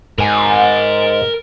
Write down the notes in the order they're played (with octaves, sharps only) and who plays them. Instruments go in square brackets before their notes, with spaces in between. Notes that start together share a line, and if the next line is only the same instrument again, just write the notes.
[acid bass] G#2 [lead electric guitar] A#4 G#5